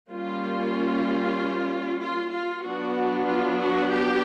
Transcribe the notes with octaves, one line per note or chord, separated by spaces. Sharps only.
G3 A#3 C#4 F4
F4
F4
F#3 B3 D4 F#4
F4
F#4
G4